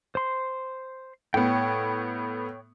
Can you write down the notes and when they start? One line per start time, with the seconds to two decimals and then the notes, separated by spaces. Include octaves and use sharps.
0.15 C5 C6
1.34 A2 B3 C#5 G5